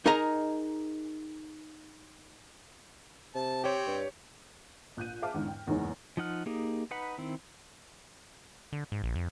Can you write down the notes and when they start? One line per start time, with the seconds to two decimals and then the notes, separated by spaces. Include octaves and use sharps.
0.06 D#4 G#4 A#4 D#5 A#5
3.35 C3 A5
3.64 C4 G4 C#5
3.87 G2
4.97 A#1 F#6 G6 D#7
5.22 G#4 E5 F5 A5 D6 F6
5.34 E2 G#2 D3
5.48 G5
5.67 F#1 E2 G#2 D#4 G#4 C#5
6.17 F3 D#4 F#5 F6
6.46 A#3 D#4 G4 G#4
6.91 D#4 B4 F#5 B5
7.18 D#3 C4 E4
8.72 D3
8.92 G#2
9.04 A#1
9.15 F2